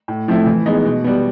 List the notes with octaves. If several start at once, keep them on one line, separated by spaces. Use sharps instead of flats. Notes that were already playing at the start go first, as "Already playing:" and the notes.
A2
F3 A3 C4 E4
E3
G#3 B3 D#4
B2
G3 B3